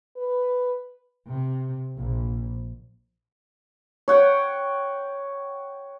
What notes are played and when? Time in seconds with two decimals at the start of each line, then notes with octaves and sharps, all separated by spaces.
0.17 B4
1.28 C3
1.95 A#1
4.08 C#5 F#5 G5